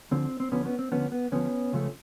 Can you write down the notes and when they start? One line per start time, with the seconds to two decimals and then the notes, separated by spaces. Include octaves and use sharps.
0.11 D2 D3 F3 C4
0.40 C4
0.52 D2 D3 F3 B3 C#4
0.65 B3 C#4
0.79 C4
0.92 D2 D3 F3 B3 C#4
1.12 B3
1.32 D2 D3 F3 B3 C#4
1.73 C#2 C#3 F3 A3